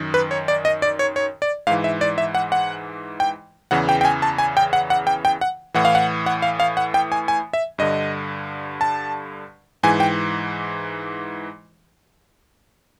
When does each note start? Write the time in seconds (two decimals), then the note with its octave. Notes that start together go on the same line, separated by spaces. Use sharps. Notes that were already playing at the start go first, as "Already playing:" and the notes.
Already playing: F#2 D#3
0.14 B4
0.31 C#5
0.48 D5
0.65 D#5
0.82 D5
0.99 C#5
1.16 C#5
1.42 D5
1.67 G#2 E3 F5
1.84 E5
2.01 D5
2.18 E5
2.35 F#5
2.52 F#5
3.20 G5
3.71 E2 C#3 E3 F#5
3.89 G5
4.01 G5
4.05 G#5
4.22 A5
4.38 G#5
4.57 G5
4.73 F#5
4.90 F#5
5.07 G5
5.25 G5
5.41 F#5
5.74 A2 E3 F#5
5.85 F5
5.95 F#5
6.26 F#5
6.42 F5
6.60 F5
6.77 F#5
6.94 G5
7.12 G#5
7.28 G#5
7.53 E5
7.78 G2 D3 D#5
8.81 A5
9.83 G#2 E3 G#5
10.00 G5